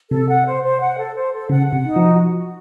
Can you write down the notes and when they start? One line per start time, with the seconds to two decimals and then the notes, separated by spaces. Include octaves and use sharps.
0.11 C3 A4
0.28 F#5
0.45 C5
0.63 C5
0.80 F#5
0.98 A4
1.15 C5
1.32 A4
1.49 C#3 F#5
1.68 C3 F#5
1.84 D#4
1.96 F3
2.01 F#4
2.19 F#4
2.37 F#4